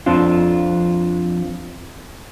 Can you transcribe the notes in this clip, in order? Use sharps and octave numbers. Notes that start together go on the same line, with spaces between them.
F2 F3 C4 D4 F4